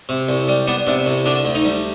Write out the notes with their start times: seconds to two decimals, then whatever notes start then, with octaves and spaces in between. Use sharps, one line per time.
0.09 C3
0.29 C2
0.48 G3
0.67 B3 D4
0.87 C3 D4
1.06 C2
1.26 D3 D4
1.45 D2
1.55 D#4
1.65 G3